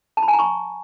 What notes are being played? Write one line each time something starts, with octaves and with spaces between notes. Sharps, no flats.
A5
B5
G#5
A#5
C#6